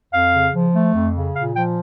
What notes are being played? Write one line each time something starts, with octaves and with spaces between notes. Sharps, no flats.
F2 F5
C#3
F3
A3
F2
C#3
A#2 F5
F3 G5